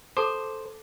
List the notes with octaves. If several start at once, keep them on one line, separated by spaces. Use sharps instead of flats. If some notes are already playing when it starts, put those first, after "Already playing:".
A4 C5 A5 D6